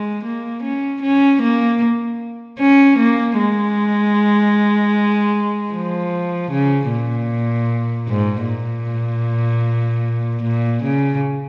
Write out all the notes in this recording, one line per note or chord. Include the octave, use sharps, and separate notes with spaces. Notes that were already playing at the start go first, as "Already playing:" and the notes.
Already playing: G#3
A#3
C#4
C#4
A#3
C#4
A#3
G#3
F3
C#3
A#2
G#2
A#2
A#2
C#3